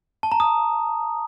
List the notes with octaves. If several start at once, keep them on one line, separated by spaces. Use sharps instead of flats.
A5
A#5
D#6